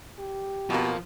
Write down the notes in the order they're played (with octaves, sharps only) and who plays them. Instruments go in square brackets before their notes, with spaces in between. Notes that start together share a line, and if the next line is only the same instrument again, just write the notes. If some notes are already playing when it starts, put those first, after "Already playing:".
[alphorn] G4
[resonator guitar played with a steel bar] F2 A#3 [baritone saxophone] B2 [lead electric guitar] F3